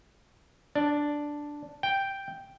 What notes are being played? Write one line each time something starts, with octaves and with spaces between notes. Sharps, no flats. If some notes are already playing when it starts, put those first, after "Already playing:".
D4
G5